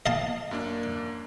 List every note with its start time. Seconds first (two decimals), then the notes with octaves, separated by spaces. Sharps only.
0.06 D#5 F5 A5
0.51 F#2 A#3 D4